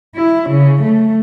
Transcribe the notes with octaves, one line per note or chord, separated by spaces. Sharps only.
E4
C#3
A3